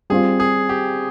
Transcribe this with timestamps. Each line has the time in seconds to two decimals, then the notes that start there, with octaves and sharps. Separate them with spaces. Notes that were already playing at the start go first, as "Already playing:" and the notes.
0.10 G3 C4 F4 G#4
0.40 G#4
0.69 G4